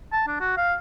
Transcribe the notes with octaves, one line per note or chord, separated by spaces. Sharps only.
A5
D4
F#4
F5